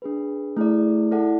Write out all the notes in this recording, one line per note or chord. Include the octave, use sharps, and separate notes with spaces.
D4 G#4 B4
A3 E4 G#4 D5
E4 A4 D5 F#5